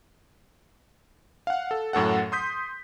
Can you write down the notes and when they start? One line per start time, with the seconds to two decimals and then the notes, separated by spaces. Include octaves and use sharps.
1.47 F5 F#5
1.71 A4
1.93 F#2 A2 A4 F#5
2.32 C6 D#6 G6 B6